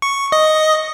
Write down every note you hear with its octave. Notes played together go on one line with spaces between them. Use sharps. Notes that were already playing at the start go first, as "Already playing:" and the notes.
C#6
D#5